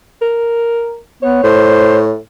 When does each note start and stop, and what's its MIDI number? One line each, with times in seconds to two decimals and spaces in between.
0.22 0.99 70
1.23 1.39 59
1.23 2.13 73
1.44 2.17 45
1.44 2.01 72